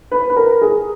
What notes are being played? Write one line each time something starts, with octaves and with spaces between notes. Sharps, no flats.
B4
B4
A#4
G#4